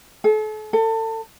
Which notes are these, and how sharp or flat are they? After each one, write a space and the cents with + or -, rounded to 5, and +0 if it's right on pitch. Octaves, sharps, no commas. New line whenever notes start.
A4 -40
A4 +30